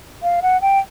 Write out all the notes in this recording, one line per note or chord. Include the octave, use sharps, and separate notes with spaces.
F5
F#5
G5